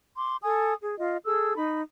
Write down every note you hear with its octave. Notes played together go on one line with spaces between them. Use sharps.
C6 D6
A4 G#5 D#6
G#4
F4 D#5
G#4 A4 E6
D#4 B5